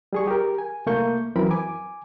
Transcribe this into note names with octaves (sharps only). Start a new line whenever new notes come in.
G3 G#4 C#6
G4 A#4
G#5
C2 A3 A#3 C#6 G6
F#2 E3 C4 A#4 B5
G#5 D6